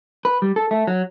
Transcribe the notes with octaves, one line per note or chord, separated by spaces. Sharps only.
B4
G3
A4
A3
F#3